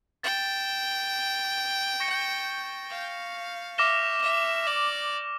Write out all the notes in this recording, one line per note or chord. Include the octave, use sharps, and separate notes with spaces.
G5 A6 E7 G7
C#6 G6 A#6 C#7
F5
E5 D6 F6 A#6 E7 G7
E5
D5